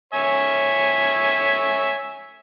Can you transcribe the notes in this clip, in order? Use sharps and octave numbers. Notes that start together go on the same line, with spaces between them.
C#5 E5 G#5